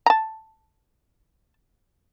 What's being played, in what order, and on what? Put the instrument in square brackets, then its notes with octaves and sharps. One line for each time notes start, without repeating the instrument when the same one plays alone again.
[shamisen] A5 A#5